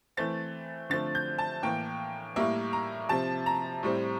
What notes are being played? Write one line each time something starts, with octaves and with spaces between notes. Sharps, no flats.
E3 A3 C4 A6
D3 F3 A3 C4 A6
G6
A5
A2 E3 A#3 G5
A2 G3 A#3 E5
A#5
C3 F3 C4 A5
A#5
A2 G3 C4